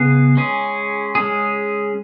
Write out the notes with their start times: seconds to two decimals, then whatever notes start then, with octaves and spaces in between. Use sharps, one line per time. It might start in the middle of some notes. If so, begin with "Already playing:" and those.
Already playing: C#3 B3 G#4
0.37 G#3 C#4 G#4
1.15 G#3 C#4 G#4